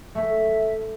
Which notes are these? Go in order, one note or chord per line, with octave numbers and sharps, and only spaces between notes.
A3 E5